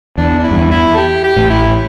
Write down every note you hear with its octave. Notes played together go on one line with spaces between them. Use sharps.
E2 D4
D4
E4
G2
E2
E4
A4
G4
G4
A1 A2
E4